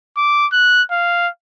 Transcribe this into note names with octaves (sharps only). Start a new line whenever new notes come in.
D6
F#6
F5